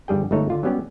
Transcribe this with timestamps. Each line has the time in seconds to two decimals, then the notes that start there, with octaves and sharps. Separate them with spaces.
0.08 G1 G2 G3 G#4 G5
0.31 G1 G#3 A3 D#4 C#5
0.50 D3 F4
0.63 F#3 G3 B3 C#4 G4